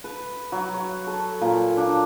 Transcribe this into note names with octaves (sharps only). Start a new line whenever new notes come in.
B4
F#3
C#5
A4
A#2
D4